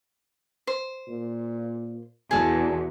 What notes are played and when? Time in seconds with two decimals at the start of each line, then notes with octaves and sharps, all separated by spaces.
0.67 C5
1.08 A#2
2.31 E2 B2 G#4 A4